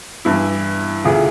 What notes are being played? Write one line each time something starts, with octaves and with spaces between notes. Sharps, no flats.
G2 E3 E4
D2 C#3 E3 F4